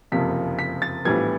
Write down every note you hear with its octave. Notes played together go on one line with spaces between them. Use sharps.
F#1 F2 C3 F3 A#3 B6
B6
A6
A#1 A2 E3 G3 B3 G#6